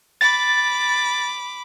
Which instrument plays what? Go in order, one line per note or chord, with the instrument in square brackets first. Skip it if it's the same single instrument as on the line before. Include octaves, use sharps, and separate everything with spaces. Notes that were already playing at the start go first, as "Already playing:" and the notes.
[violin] B5 D6 [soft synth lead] A6